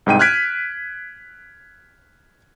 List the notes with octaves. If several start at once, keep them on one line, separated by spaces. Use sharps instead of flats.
C2 G#2 G5 D#7
F6 F#6 G#6 B6 D7